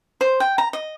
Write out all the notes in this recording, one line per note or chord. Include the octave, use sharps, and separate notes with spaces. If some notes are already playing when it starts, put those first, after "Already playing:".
C5
G5
A#5
D#5